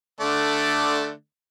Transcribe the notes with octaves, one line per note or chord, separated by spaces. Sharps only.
D3 A3 D5